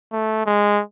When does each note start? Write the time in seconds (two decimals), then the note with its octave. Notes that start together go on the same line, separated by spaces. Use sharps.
0.13 A3
0.46 G#3